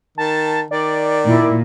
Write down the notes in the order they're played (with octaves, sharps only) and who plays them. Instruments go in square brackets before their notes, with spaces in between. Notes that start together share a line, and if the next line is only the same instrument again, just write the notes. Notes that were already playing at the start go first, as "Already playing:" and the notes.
[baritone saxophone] D#3 [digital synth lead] A5
[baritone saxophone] D#3 [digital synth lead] D5
[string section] A#2 [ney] E4